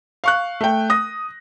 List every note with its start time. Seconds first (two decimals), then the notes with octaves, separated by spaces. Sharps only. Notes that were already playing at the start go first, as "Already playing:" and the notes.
0.24 F5 C#6 F#6
0.61 A3 G5
0.90 D#6 A#6